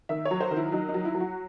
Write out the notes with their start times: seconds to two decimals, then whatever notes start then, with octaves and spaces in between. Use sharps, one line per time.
0.09 D#3 E5
0.25 C#5
0.31 F#3
0.40 C5
0.51 D#3
0.56 E4
0.72 F#3 D#4
0.89 D#4
0.94 F#3
1.05 E4
1.15 F#3
1.20 F#4